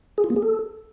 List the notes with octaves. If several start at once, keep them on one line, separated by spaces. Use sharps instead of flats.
G#4
F4
A#3
G#4
A4